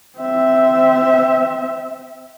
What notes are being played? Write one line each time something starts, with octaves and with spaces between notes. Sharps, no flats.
C4 E5